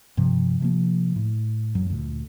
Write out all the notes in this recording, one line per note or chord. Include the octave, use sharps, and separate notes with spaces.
G2 C3 F3
C3 F3 A#3
A2
F#2 F#3
D2 A#2